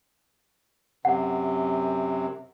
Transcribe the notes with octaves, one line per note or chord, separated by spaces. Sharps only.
F#2 C3 F#5